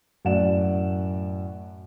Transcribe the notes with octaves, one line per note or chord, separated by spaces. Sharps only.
F#2 A2 D5 F#5 E7